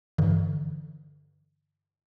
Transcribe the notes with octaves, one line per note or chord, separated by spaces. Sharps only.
G2 D3 E3